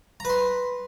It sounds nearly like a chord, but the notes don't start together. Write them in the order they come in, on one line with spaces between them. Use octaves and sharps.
A#5 B4 C6